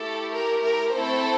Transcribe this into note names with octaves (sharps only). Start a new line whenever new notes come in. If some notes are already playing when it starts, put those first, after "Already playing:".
Already playing: A3 E4 G4 A4
A#4
A#4
A3 C4 E4 A4 C5